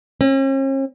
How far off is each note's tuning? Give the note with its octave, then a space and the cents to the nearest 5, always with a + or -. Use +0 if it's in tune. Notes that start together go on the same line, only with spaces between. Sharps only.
C#4 -45